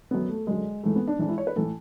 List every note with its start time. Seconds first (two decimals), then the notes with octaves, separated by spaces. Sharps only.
0.11 F#2 D3 B3
0.29 A3
0.47 F#2 D3 G#3
0.83 G#2 E3 A3
0.96 B3
1.08 D4
1.19 G#2 E3 D4
1.29 E4
1.38 C#5
1.47 B4
1.56 A2 E3 A4